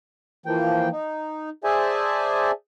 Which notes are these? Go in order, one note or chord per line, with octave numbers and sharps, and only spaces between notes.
E3 F3 A#3 G5
D#4
G#4 C5 D5 E5 G#5 A5